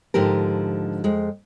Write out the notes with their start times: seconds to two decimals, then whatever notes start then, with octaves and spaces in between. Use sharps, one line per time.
0.14 G#2 D3 F3 G4 A#4
1.04 F2 G#3